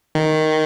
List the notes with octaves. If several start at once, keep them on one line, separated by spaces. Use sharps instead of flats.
D#3